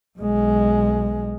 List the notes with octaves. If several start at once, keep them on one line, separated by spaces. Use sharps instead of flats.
B1 G#3